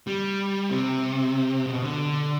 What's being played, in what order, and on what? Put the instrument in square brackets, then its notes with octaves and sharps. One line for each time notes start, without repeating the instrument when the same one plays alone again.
[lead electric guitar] G3
C3
B2
D3